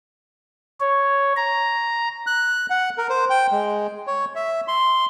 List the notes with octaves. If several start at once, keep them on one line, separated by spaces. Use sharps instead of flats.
C#5
A#5
F#6
F#5
A#4
C5
G5
G#3
C#5
E5
C6